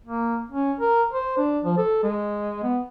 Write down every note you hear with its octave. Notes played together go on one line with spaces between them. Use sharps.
A#3
C#4
A#4
C5
D4
F3
A4
G#3
B3